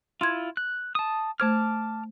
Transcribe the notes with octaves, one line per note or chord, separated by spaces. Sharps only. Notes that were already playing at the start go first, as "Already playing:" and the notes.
E4 F4 C6 G#6
F#6
A5 D#6
A3 C5 A5 D6 F6 G#6